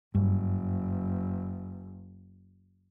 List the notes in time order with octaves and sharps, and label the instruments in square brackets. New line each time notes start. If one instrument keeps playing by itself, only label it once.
[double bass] F#1 [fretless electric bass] G2